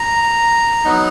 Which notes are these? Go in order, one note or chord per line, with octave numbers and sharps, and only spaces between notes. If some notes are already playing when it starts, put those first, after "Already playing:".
Already playing: A#5
F#3 B3 D#4